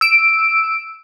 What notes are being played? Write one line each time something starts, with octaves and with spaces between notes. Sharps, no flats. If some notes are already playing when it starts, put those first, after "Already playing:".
E6 D7